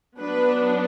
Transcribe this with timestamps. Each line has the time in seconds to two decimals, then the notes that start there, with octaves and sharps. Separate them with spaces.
0.19 F#3 B3 D4 B4